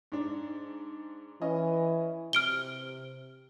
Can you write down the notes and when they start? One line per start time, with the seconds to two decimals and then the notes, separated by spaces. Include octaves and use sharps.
0.12 G#2 D4
1.42 E3 C#4 D#5
2.33 C3 F6 D7 G7